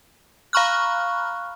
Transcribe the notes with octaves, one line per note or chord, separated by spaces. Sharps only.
F5 A#5 B5 C#6 F6 F#6